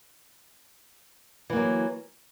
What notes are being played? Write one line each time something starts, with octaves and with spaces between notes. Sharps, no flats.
E3 F#3 A#3